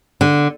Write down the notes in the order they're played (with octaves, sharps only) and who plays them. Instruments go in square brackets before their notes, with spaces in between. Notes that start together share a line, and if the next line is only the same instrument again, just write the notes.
[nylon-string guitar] D3